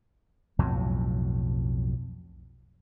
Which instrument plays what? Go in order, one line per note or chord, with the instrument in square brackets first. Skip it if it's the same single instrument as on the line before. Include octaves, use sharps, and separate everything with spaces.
[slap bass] B1 F2 A2 F#3